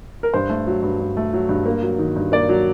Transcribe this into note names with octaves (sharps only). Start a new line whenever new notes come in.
A#4
G2 C5
A3
F#3
G2
G2
A3
F#3
G2
A#3
F#3
D#3
G2
A#3 D5
F#3